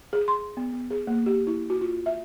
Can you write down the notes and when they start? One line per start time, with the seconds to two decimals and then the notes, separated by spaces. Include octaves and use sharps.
0.13 G#4
0.28 C6
0.57 B3
0.74 B3
0.90 G#4
1.07 A#3
1.26 G4
1.47 E4
1.70 F#4
1.81 F4
2.06 E5